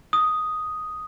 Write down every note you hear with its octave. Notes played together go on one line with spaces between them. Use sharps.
D#6